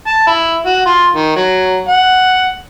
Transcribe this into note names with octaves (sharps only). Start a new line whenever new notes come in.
A5
E4
F#4
F4
D#3
F#3
F#5